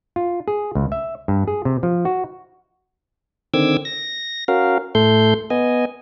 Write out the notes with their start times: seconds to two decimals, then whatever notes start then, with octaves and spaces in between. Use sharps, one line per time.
0.16 F4
0.48 G#4
0.75 C#2
0.92 E5
1.28 G2
1.48 G#4
1.65 C3
1.83 F3
2.05 F#4
3.54 D3 D#3 C4 D6 E6 G#6
3.85 A#6
4.48 C#4 F#4 A#4 F5
4.95 A2 A3 A4 C6 G6
5.50 B3 D#5 G#5